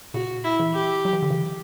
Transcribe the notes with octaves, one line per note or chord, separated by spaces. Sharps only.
A#2 C#3 F#4
E4
C#3 E3
G4
F#3
E3
D3
C#3 E3